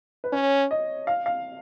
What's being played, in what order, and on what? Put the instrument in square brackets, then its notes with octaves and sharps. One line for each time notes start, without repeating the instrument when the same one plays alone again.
[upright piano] B4
[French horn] C#4 [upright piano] C#5
[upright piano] D#5
F5
F5